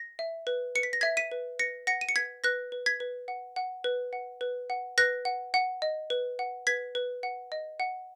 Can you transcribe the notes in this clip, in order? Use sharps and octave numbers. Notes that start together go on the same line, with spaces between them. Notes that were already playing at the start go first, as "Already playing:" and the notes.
Already playing: A#6
E5
B4
B4 C#7
B6
A#6
E5 G#6 B6
B6 D#7
B4
B4 A#6 C#7
F#5 A#6 C#7
D#7
C#7
B4 G#6 B6
B4 F#6 A#6
B4
G#6 B6
B4
F#5
F#5
B4
F#5
B4
F#5
B4 F#6 A#6
F#5
F#5
D#5
B4
F#5
B4 G#6 B6
B4
F#5
D#5
F#5